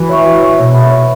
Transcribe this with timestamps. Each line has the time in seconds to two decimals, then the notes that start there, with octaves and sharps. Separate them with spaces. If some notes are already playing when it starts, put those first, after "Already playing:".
Already playing: E3 F#4
0.09 C#5 E5 C#6
0.25 F#4
0.42 C#5 E5 C#6
0.58 B2 C#5
0.74 E5 B5
0.91 C#5